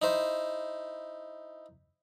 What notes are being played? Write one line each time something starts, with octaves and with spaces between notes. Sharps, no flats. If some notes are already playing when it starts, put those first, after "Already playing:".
D#4 E4 C5